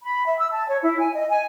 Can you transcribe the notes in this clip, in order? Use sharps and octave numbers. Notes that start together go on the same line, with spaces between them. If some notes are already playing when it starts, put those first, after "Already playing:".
B5
E5
E6
A5
C#5
E4
G#5
D#5
G#5